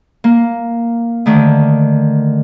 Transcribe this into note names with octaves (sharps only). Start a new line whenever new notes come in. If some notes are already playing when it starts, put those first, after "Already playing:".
A#3
D3 D#3 A3